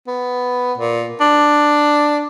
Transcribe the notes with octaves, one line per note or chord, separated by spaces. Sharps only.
B3
A#2
D4